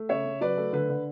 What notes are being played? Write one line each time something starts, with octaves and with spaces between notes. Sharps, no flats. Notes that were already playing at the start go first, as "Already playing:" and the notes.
Already playing: A3
C#3 C#5 E5
C#3
F#3 B4 D5
A3
D3 B4
D3